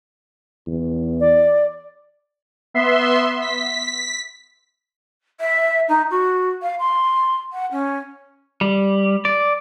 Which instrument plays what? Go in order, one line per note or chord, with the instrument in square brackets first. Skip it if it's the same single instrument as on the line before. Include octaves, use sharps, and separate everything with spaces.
[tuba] E2
[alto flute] D5
[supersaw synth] B3 E5 C6
B6
[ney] E5
D#4
F#4
F5
C6
F#5
C#4
[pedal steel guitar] G3
D5